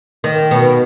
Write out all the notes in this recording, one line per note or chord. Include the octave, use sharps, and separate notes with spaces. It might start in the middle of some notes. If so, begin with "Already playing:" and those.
D#3
B2